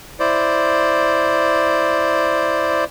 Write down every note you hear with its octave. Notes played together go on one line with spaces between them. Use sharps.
E4 C5 D5